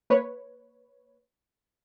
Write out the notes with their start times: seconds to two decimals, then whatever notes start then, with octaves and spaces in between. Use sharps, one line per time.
0.10 A#3 B4 C#5